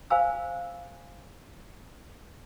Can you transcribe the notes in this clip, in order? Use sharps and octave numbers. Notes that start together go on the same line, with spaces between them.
C5 F5 G#5 E6